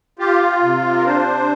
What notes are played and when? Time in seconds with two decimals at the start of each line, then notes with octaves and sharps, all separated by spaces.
0.19 F4 G4
0.62 C3
0.98 A#4
1.05 D4 C5